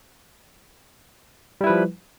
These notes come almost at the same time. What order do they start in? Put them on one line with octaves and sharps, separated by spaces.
G3 E4 B4 F3